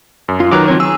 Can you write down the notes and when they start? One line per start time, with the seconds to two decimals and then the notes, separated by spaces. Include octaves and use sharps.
0.28 F#2
0.40 F4
0.52 D#3 F#3 F#4 B4 A#5 D6
0.68 F3 C4 C#5
0.80 G#4 E6